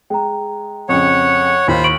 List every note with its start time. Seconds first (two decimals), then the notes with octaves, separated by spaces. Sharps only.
0.10 G#3 G5 A#5
0.89 F2 C#3 C#5 F#5
1.68 D#2 F4 C5 B5
1.84 C#6 D7 F#7